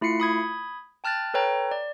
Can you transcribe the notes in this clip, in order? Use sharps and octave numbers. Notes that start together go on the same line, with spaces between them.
A3 E4 F4 C7 C#7
B5 D#6 G#6
G5 A5 F6 F#6 A6
A4 B4 C#5 G5 A#5
D5